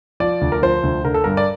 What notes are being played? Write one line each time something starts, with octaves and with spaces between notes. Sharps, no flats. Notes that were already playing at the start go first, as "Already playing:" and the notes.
F3 D5
D2
A#4
F3 C5
D2
D3 A#4
A4
G2 A#4
D5